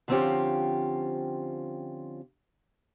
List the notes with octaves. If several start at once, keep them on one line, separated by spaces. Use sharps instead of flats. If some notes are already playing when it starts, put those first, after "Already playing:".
D3 F3 C4 C#4 F4 G4